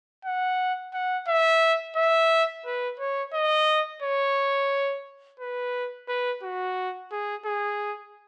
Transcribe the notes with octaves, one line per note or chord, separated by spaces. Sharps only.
F#5
F#5
E5
E5
B4
C#5
D#5
C#5
B4
B4
F#4
G#4
G#4